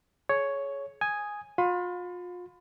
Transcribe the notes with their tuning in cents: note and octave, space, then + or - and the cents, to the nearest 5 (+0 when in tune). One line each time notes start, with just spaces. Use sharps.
G#4 +35 C#5 +5
G#5 +0 D#6 +0
F4 +35 B5 +40